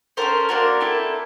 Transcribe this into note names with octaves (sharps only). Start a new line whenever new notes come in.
C#4 F#4 A4 A#4 C5
A#3 D4 F#4 A#4 C5
C4 E4 A4